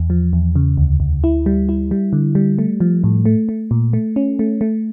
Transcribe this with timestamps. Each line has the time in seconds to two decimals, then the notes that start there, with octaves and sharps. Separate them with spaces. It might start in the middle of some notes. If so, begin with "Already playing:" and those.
Already playing: E2
0.10 F3
0.33 E2
0.56 C#3
0.77 D2
1.00 D2
1.24 E4
1.46 G3
1.69 E4
1.91 G3
2.13 D3
2.35 G3
2.59 A3
2.80 F3
3.04 A2
3.25 A3
3.49 A3
3.71 A#2
3.93 A3
4.16 C#4
4.39 A3
4.61 A3